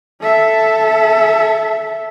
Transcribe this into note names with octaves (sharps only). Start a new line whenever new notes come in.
A4 E5